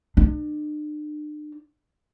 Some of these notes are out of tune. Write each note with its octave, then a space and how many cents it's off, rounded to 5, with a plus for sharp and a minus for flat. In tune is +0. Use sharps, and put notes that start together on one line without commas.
D4 +40